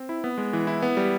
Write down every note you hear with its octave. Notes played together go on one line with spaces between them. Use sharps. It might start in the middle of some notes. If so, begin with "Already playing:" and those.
Already playing: C4
E4
B3
G#3
E3
E4
B3
G3